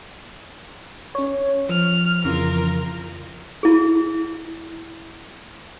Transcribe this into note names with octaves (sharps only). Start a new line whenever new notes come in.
C#4 C#5
F3 F6
F2 C#3 E3 F4 A#4
E4 G#4